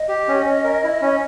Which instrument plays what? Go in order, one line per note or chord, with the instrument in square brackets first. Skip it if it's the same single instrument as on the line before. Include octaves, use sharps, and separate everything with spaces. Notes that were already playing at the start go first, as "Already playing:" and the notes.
Already playing: [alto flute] D#5
[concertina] G4
C#4
C#4
A#4
E4
C#4